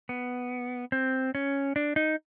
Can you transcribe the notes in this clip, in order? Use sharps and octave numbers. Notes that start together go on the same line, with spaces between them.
B3
C4
C#4
D4
D#4